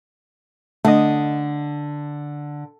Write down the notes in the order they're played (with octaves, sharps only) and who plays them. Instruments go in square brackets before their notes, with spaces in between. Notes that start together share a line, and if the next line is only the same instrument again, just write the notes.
[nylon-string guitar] D3 [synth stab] A3 D#5